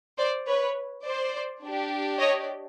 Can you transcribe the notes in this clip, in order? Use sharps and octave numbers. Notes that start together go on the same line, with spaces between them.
C5 D5
B4 C#5
C5 D5
D4 G4
C#5 D#5